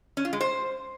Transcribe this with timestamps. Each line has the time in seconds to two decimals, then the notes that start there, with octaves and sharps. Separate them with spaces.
0.17 C#4
0.25 F4
0.33 G#3
0.41 C5